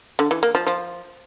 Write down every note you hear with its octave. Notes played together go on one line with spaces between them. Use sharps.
D3
E3
A#3
F3
F3